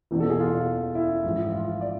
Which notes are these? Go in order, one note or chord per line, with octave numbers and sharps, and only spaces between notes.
E1 E2 B2
A4
G#4
F4
E4
A1 G#2 F3
F4
D5